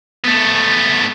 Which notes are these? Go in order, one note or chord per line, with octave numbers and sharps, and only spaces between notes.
A3 B3